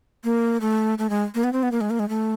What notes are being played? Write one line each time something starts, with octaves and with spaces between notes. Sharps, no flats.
A#3
A3
A3
G#3
A#3
B3
C4
B3
A#3
G#3
A#3
G#3
A3